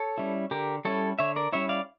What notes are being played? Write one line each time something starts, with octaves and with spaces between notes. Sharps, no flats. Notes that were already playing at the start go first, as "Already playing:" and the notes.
Already playing: A4 C#5
G3 C#4 E4
D3 G4 A#4
G3 C#4 E4 A4 C#5
D3 C#5 E5
A#4 D5
G3 C#4 E4 C#5 E5
D5 F5